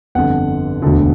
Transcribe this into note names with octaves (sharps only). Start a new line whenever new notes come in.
G1 F2 D3 F#5
E1 D2 D3